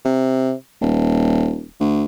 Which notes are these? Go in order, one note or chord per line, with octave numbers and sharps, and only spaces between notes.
C3
D#1
D2